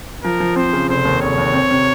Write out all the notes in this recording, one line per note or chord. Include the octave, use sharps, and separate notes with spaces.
F3 A#4
F3
C4 C5
C#3
F1 C5
D#2
F1 C#5
D#2
C4
C3